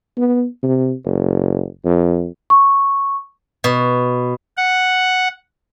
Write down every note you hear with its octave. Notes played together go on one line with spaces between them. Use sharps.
B3
C3
F#1
F2
C#6
B2
F#5